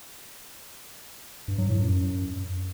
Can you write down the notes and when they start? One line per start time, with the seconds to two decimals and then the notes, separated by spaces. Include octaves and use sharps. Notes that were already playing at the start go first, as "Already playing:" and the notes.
1.48 G2
1.58 F#3
1.69 A2
1.79 F#2